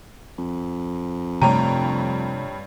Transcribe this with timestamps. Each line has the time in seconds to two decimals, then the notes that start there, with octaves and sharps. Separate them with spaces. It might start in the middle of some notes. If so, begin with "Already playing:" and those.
0.38 F2
1.42 G2 C3 A3 C#5 G5 A#5